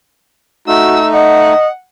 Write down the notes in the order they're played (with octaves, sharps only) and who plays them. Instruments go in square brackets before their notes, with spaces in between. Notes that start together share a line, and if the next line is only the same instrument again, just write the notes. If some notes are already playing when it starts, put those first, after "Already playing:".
[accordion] A3 D#4 [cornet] F#4 [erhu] E6
[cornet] D#5 [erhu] F#5